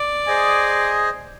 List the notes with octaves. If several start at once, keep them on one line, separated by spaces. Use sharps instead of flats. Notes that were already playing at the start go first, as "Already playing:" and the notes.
Already playing: D5
G#4 C5 D#5 G#5